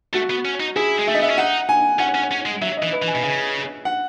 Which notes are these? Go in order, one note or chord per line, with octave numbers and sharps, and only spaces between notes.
A3 F#4
B3
C#4
D#4
E4 G#4
G#3
A3 E5
D#5
B3 E5
C#4
D#4 F#5
G#5
C#4 F#5
C#4
C#4
G#3
F#3 E5
D#5
E3
B4
E3
G#5
B2
C#3
F#5